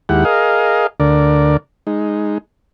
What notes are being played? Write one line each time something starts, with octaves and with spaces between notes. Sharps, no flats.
D#2 G#3 E4 G4 F#5
G#4 A#4 D#5 F5
D2 D3 A#4 D5
G#3 D#4